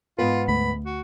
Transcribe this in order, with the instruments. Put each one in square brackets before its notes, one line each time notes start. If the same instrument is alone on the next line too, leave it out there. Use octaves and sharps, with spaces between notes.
[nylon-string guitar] G#2 B3 B4 [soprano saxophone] F4
[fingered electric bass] D2 A3 [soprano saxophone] B5
[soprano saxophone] F#4